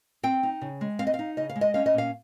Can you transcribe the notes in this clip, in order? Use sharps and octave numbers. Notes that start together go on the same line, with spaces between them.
C4 G5
D#4
C#3
G#3
C4 F5
D#5
F5
D#4
C#3 D#5
F5
G#3
D#5
C#4 F5
D#5
A#2 F5